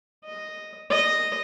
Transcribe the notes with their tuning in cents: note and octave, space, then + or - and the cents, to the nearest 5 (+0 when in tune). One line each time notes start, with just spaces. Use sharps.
D#5 -5
D#5 -5